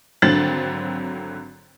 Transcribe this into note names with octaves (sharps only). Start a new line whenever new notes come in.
G#1 D3 F#3 C4 A6 F#7